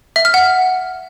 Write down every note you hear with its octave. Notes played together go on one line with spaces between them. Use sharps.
E5
F6
F#5